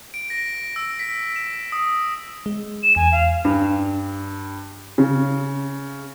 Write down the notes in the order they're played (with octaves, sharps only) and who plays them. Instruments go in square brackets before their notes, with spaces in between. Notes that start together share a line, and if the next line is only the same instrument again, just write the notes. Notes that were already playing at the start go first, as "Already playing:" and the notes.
[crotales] D7
A#6
E6
B6
E7
D#6
[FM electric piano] G#3
[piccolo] E7
[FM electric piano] E2 [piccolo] G#5
[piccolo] F5
[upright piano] G2
C#3